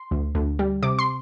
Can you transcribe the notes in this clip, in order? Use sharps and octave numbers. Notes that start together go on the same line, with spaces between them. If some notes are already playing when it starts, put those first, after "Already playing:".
Already playing: C6
D2
D2
G3
C3 D6
C6